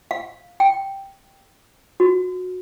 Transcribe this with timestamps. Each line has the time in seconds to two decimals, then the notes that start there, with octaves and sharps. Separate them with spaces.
0.11 F5
0.60 G5
2.00 F#4